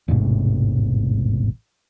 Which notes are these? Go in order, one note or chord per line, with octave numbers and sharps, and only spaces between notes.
E1 A1 G#2 C3